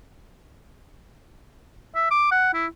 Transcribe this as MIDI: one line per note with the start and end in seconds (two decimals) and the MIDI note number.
1.95 2.07 76
2.11 2.27 86
2.31 2.52 78
2.54 2.66 64